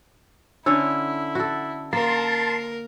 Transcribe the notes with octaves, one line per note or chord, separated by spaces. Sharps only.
D3 C#4 E4 C#5 E6
F#4 A4
A#3 A#4 A5 C6